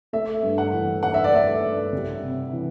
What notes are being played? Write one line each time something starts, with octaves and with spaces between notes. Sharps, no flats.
A3 E5
G2
F#5
E3
G2 F#5
E5
D5
A3 E5
G2
G3
C3
E3